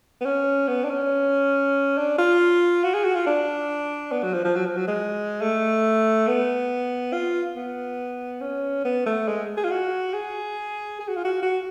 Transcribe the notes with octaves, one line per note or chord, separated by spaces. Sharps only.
B3
C#4
B3
D4
C#4
D4
F4
F#4
G#4
F#4
F4
D4
B3
F#3
F3
F3
F#3
F3
F#3
G#3
A3
B3
F4
B3
C#4
B3
A3
G#3
G#4
F4
F#4
G#4
G#4
F#4
F4
F#4
F#4